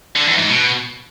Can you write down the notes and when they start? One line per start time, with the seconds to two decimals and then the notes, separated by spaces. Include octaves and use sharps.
0.15 D3
0.27 E2
0.38 G#2
0.49 B2